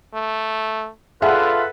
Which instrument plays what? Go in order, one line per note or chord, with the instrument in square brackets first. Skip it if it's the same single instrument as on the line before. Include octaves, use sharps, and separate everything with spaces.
[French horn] A3
[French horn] D3 [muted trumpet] F4 [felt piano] G#4 E5 F#5 [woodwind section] A4 B4